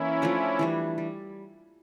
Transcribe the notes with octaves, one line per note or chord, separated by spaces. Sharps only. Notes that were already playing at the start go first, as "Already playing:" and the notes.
Already playing: E3 A#3 C#4 E4
F3 A3 D4
E3 G3 D4
G3